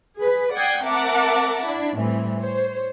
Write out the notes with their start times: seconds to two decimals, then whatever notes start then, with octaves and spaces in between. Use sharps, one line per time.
0.17 G#4 B4
0.55 D5 F#5 G5 D#6 G#6 C7
0.85 C4 A#4 E5 F#5 A5 D6
1.64 D4 E4
1.97 A2 E3 G3 C4
2.39 C5 C#5